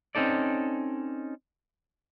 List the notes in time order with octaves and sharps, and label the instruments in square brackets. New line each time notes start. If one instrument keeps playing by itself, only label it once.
[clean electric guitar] C4 C#4 D#4 A4 D5